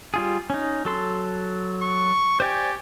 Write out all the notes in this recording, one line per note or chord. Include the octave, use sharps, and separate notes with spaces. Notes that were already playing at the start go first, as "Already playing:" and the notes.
G3 F4 G#4
C#4 D#4
F#3 A4 C6
C#6
G4 C5 D5 G#5